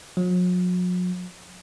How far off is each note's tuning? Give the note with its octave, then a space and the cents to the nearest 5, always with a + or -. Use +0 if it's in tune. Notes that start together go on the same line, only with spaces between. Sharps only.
F#3 -45